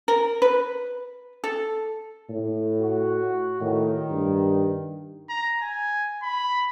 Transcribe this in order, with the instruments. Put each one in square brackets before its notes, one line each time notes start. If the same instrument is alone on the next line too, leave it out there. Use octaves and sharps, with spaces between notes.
[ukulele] A#4
B4
A4
[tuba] A2
[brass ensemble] F#4
[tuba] A2 [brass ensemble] D#3
[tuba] G2
[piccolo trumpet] A#5
G#5
B5